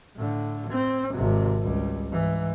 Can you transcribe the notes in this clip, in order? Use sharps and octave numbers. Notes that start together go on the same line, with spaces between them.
A2 D3
C4
G#1 C3
C#2 G3
G#2 E3